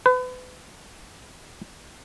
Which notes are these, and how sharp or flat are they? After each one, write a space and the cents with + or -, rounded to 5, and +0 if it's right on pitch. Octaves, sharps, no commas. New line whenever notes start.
B4 +35